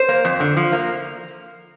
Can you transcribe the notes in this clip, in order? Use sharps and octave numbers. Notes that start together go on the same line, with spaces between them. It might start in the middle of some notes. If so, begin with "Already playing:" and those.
Already playing: C5
A#3
F2
D3
F3
A#3